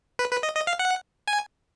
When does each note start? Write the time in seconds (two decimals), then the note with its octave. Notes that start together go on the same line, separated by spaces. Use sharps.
0.19 B4
0.31 B4
0.43 D#5
0.55 D#5
0.67 F5
0.79 F#5
1.28 G#5